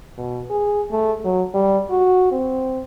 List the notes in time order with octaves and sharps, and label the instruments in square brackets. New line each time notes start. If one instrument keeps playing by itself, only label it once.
[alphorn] B2
G#4
A3
F#3
G3
F#4
C4